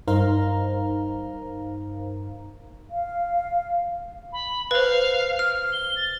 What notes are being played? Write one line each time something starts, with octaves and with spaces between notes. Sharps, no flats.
G2 D#4 A#4 C5 F5 A#5
F5
B5
B4 C5 F5
F6
G7
A6